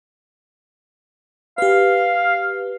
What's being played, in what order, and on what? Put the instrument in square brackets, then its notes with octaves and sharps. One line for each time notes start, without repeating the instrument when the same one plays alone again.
[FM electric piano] G4 B4 [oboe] F5